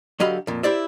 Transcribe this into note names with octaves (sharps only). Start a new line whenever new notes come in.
D3 F#3 G4 D#5 F5 B5
F2 A#2
E4 G4 C5 D5 E5